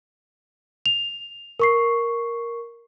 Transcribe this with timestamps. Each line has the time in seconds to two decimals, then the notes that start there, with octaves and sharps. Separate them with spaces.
0.86 F7
1.59 A#4 C#6 C7